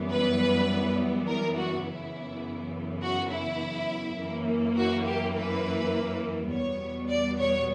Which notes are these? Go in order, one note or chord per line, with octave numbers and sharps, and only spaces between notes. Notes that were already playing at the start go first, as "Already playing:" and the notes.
Already playing: F#2 E3 G3 B3
B4
A#4
F#4
F#2 C#3 E3 B3 E4
F#4
E4
F#2 E3 A#3
F#4
G4
B4
E2 B2 G3 B3 C#5
D5
C#5